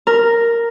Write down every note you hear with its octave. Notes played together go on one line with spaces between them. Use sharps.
A#4